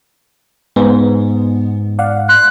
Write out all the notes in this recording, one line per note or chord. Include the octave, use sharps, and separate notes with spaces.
G#2 B3
D5 F5 F#5
C6 F#6